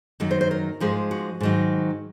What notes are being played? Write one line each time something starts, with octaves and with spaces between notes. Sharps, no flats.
F#2 D#3 F#3 A#3
C5
C5
A#4
G#2 F3 G#3
F#4
G#2 D#3 F#3